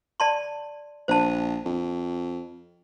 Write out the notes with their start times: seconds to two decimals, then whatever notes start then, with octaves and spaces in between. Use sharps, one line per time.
0.20 D5 A5 C6
1.08 A#1 C5 A5
1.65 F2